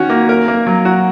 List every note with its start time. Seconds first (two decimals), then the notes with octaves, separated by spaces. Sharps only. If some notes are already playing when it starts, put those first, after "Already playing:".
Already playing: D#3 C#4 F#4
0.10 A#3
0.29 A#4
0.48 A#3
0.67 F#3
0.85 F#4